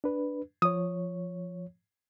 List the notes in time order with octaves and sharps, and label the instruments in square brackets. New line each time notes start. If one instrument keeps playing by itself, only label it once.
[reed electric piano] D4 B4
[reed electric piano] F3 C#5 [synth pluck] D#6